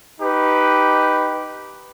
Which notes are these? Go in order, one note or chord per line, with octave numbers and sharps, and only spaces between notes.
D#4 G4 B4